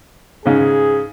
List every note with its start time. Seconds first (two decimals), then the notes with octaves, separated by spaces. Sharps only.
0.46 G#2 C#3 G#4